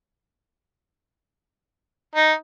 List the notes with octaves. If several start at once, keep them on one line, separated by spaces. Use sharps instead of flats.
D#4